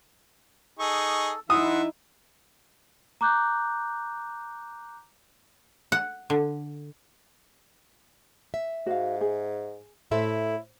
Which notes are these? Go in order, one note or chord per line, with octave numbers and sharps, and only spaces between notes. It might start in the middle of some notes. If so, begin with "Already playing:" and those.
D#4 G#4 A4 C#6
E3 D#4 E4 E5 F#5 C6 D#6
A#5 D6 F#6 G6
F#5
D3
E5
G#2 F#4 F5
G#4
A2 E4 A4 C5 E5